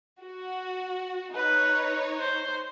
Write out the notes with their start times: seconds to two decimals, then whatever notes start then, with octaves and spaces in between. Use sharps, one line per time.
0.20 F#4
1.35 D#4 B4 C#5
2.20 C5